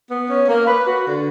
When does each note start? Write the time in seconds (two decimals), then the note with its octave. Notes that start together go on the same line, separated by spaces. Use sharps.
0.09 B3
0.28 C#4
0.48 A#3
0.67 B4
0.86 F#4
1.05 D3